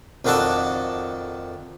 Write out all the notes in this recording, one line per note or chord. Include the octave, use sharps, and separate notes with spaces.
F2 D#3 D4 F#4 A4 A5